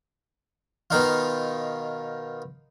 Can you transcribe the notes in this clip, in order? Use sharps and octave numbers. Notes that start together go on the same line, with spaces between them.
B2 D#3 D#4 F4